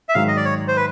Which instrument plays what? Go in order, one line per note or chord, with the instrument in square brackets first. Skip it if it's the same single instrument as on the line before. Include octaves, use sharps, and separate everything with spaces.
[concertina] E5
[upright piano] G#2 D#3 F#3 [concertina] F5
[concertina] D#5
D5
C#5
C5
B4